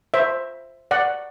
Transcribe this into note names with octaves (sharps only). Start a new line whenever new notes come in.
C5 E5
D5 F#5